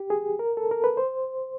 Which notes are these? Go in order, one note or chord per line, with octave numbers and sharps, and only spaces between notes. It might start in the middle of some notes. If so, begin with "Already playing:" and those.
Already playing: G4
G#4
A#4
A4
A#4
B4
C5